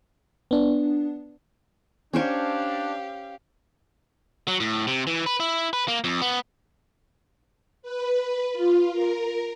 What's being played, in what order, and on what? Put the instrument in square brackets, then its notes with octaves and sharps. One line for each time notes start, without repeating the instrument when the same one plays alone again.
[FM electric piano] B3 D4
[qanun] C#4 C5 C#5 [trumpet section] D4 [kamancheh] G4 F5
[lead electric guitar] F#3
A2
C3
E3
B4
E4
B4
A#3
F2
B3
[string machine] B4
F4
A#4